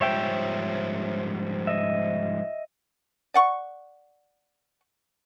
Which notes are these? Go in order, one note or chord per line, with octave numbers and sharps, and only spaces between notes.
G#2 F3 G3 C#5 E5 G5
D#5 E5
D5 F#5 C#6